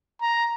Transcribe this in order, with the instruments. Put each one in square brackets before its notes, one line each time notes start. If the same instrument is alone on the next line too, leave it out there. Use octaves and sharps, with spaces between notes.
[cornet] A#5